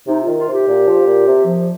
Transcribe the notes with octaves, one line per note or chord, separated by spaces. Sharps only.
C3 D#4
F4
D#3
F4
C3
G4
A#2
F3
A#2
C3
F3